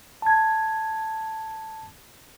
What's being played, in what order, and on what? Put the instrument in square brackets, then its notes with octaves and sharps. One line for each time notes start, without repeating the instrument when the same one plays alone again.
[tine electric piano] A5 G#6